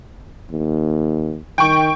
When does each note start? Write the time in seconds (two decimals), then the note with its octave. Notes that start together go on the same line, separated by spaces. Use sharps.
0.51 D#2
1.58 D#3 G5 C#6